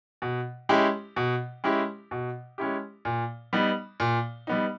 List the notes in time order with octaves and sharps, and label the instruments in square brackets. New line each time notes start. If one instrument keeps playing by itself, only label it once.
[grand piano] B2
G#3 C#4 E4 G4
B2
G#3 C#4 E4 G4
B2
G#3 C#4 E4 G4
A#2
G3 B3 D#4
A#2
G3 B3 D#4